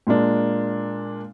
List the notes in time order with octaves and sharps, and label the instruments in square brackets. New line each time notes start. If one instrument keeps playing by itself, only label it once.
[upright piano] A#2 G#3 A#3 D4